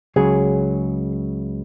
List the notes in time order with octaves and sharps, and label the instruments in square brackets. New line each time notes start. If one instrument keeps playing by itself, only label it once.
[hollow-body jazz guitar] C#2 C#3 F#3 G#4